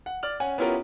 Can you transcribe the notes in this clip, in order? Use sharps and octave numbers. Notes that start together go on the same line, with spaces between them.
F#5
D5 F6 F#7
C#4 F#5 G#5
B3 C#4 E4 F4 G4 A#4